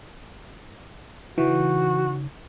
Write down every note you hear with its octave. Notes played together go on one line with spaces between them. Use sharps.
C#3 E3 D#4 F#4